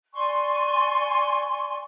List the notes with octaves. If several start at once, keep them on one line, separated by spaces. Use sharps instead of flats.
D5 G#5 C6 C#6